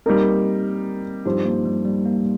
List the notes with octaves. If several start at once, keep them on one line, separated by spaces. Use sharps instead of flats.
G3 A#3 C4 D#4 A#4
G2 F3 C4 D#4 G4
A#3
G3
G3
A#3